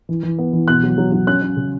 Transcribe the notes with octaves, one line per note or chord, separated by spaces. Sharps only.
E3
E3
B3
E3
B2 F#6
F#3
F#3
F#3
C#4 F#6
C#4
C#3